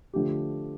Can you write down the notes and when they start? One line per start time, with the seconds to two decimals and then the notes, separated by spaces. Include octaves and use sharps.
0.13 D3 F3 A3 D4 G4